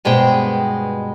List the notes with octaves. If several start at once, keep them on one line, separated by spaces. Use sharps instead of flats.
G2 B2 G#3 C5 G5